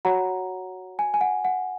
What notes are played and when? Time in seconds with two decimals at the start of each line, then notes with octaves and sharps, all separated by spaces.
0.05 F#4 C#5 F#5 A#5
0.99 G#5
1.14 G#5
1.21 F#5
1.45 F#5